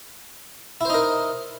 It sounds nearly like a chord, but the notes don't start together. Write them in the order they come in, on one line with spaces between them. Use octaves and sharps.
E4 C5 D#4 A#4